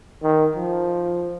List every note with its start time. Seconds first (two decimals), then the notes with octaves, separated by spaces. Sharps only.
0.22 D#3
0.56 F3